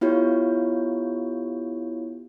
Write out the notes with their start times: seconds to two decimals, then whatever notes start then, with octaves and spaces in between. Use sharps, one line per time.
0.01 B3 E4 F4 G4 C#5